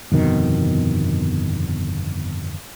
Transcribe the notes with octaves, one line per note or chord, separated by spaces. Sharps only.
G1 F2 B2 D#3